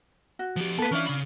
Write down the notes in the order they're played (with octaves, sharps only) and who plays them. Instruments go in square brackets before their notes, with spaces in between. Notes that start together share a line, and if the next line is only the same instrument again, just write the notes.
[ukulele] F#4
[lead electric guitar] F3 G4
[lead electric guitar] A#3 B3 [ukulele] A4 B4
[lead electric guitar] E3 E5 [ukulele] C#4 D4 F4
[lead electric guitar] C#3 B5